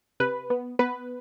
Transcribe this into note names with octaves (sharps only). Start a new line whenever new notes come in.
C3 B4
B3
B3 B4